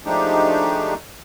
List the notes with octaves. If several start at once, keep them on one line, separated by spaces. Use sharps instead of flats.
F3 G#3 A3 D4 D#4 G4